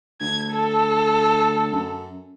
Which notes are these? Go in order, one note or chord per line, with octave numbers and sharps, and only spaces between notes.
D2 G#6
A4
F#2